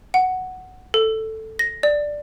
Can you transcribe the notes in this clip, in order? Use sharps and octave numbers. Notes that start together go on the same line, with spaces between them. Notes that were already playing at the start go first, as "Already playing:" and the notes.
F#5
A4
A#6
D5